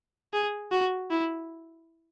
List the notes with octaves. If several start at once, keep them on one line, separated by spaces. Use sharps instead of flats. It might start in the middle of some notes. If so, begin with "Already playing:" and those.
G#4
F#4
E4